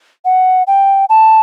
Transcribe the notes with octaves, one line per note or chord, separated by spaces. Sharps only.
F#5
G5
A5